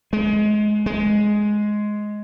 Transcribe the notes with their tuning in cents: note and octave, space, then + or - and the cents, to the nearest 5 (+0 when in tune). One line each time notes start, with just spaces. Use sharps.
G#3 +25
G#3 +10